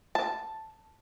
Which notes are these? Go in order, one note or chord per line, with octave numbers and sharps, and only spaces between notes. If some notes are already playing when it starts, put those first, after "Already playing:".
A5